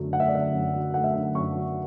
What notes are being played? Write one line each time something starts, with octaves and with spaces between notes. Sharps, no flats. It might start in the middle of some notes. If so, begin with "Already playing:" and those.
Already playing: F#2 D3 F#3 A3
A3 F#5
E5
D5
D3 E5
F#2
F#3
A3 F#5
E5
D3 F#5
F#2 C#6
F#3